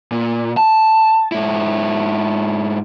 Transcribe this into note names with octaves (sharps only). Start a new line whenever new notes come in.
A#2
A5
G#2 E4